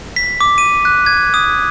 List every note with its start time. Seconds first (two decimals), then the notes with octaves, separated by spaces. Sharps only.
0.16 B6
0.41 D6
0.58 D#7
0.85 F#6
1.06 G#6
1.34 D#6